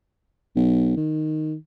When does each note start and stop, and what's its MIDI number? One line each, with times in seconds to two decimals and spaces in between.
0.56 0.93 35
0.97 1.55 51